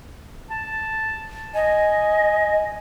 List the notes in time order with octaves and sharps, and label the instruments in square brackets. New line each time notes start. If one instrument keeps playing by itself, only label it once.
[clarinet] A5
[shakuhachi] D#5 [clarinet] G#5